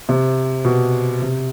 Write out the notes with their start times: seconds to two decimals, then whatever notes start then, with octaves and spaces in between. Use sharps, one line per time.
0.09 C3
0.65 B2
1.22 C3